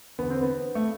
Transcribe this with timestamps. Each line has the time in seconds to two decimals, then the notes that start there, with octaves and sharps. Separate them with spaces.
0.18 E2 D3 B3
0.30 C4
0.42 B3
0.75 A3